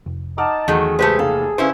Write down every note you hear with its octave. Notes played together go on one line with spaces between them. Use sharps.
F1
D#4 F#5 A5 D6 F6
E2 D#3 F#3 A3 G#4
C#2 A3 G4 B4 C5
F1 D#2 A4 F5
G2 C#3 C#4 E4 B4 C5 G#5